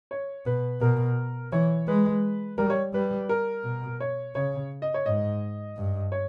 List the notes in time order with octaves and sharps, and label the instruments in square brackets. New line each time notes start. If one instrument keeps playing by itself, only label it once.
[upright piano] C#5
[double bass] B2 [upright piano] B4
[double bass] B2 [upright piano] A#4
[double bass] E3 [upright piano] C#5
[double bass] G#3 [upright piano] B4
[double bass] G3 [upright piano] A#4
[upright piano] C#5
[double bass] G3 [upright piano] B4
[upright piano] A#4
[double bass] B2
[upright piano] C#5
[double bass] C#3 [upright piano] C#5
[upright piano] D#5
C#5
[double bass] G#2 [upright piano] D#5
[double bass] G2
[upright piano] C#5